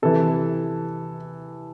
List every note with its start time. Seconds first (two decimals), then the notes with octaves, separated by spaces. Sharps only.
0.02 C3 E3 A4